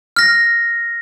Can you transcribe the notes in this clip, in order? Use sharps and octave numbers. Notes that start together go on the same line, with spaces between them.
F6 A#6